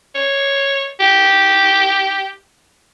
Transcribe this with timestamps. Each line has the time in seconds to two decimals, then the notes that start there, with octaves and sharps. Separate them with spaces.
0.15 C#5
1.00 G4